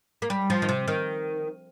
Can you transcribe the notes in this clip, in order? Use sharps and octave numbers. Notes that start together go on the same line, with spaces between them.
A#3
G3
F3
D#3
C3
D#3